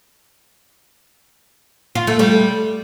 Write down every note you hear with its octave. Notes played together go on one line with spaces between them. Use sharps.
F4
A3
G3